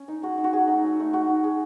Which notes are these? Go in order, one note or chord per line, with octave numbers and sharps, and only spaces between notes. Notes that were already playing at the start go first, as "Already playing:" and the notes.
Already playing: C#4
D#4
G#3 F#4
D#4
F#4
F#3 G#4
A3 D#4
F#3
A3 D#4
G#3 F#4
D#4
G#3 G#4